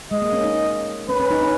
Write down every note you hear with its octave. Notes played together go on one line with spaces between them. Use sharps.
G#3 D#5
A#3
C#4
D#4
C#4 B4
C#4
D#4
C#4